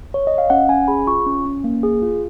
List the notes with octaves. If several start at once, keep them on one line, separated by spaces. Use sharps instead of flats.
C#5
D#5
F5
C#4 F#5
C#4 G#5
G#4 B5
F4 C#6
C#4
C#4
A#3
G#4
F4